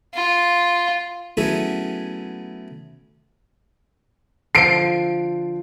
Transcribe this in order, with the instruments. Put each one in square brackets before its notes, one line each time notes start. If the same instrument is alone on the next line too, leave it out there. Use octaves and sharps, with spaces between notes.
[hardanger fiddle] F4
[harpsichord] F#3 A3 B3 C#4 E4 G#4
[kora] D3 F3 [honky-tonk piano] C7 D7